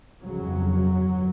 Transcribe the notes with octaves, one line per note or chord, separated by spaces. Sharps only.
G1 F2 C#3 F#3
G1